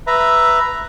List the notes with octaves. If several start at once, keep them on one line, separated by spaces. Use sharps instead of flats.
B4 E5 A#5